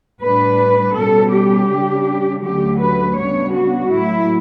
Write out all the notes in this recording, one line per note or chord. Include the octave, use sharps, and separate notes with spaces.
A2 G3 D4 B4
B2 G3 C#4 A4
G4
C#3 G3 D4
D2 D3 F#3 A3 C#4 G4
B4
C#3 G3 B3 D4 C#5
F#4
A2 F#3 A3 E4